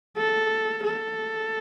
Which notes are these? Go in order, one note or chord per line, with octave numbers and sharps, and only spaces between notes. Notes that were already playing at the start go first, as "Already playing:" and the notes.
A4
A4